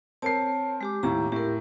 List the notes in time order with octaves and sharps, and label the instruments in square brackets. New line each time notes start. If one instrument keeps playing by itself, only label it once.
[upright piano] C4 A#4 C7 [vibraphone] C#5 A5
[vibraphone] G#3 G4 D6
[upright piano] D#2 A2 [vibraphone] G4 A#5
[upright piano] A2 [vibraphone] G4 A#4